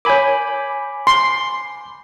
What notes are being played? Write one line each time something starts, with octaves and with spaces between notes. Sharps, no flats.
A#4 C#5 G#5 B5 D6
C6